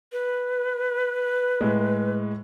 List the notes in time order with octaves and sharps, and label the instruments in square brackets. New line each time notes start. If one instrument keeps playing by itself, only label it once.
[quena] B4
[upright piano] A2 G#3